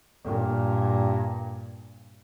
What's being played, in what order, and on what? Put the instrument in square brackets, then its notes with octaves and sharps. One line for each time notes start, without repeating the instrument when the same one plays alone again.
[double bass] G2 A#2